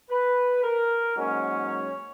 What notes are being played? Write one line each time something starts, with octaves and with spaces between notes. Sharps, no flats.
B4
A#4
G#2 F#3 A#3 C#4
C#5